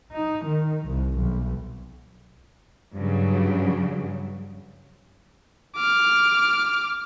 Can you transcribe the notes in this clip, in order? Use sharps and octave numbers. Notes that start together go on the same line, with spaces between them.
D#4
D#3
C2
B1
G2 C#3 F#3
D6 F6